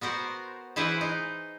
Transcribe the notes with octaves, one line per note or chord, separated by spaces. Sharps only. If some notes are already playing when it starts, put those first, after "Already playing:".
B3 F#4 A#4 C5
E3 E4 G#4 B4 C5
D#4